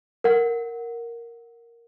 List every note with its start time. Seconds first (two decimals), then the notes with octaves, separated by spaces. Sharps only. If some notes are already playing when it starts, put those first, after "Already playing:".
0.24 A#4 F#5